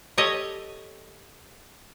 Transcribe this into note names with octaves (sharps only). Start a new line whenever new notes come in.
G4 A4 C#5 D#5